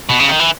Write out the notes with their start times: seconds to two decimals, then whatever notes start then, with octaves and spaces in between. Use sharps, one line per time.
0.09 B2
0.20 C#3
0.29 D#3
0.40 E3